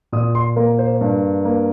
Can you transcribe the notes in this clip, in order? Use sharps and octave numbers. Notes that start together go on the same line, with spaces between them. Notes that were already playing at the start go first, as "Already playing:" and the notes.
A#2 D#6
C6
A#3 A#4
C5
G2
A#3